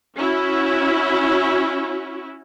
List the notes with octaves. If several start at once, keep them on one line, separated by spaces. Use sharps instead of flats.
C#4 E4 F#4